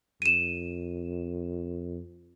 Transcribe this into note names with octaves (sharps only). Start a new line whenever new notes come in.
F2 D#7 E7